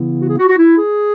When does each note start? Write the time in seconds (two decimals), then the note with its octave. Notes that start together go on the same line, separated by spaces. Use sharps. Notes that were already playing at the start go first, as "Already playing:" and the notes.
Already playing: C#3 E3 B3 E4
0.21 F#4
0.28 G#4
0.38 F#4
0.48 F#4
0.57 E4
0.76 G#4